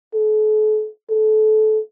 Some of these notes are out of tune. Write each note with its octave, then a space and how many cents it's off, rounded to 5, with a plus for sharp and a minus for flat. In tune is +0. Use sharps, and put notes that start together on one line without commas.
A4 -40
A4 -25